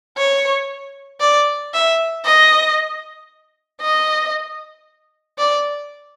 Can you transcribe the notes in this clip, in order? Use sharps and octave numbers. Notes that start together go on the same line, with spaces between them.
C#5
D5
E5
D#5
D#5
D5